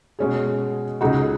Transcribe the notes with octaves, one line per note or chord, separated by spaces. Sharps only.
B2 G#3 C#4 G#4
C#2 C#3 G#3 D#4 F#4